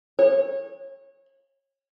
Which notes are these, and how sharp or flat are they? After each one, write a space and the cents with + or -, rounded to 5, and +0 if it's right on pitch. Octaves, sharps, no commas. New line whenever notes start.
C#5 -25